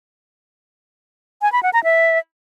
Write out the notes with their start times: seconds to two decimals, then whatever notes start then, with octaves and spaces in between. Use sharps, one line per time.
1.42 G#5
1.52 B5
1.63 F#5
1.73 A#5
1.84 E5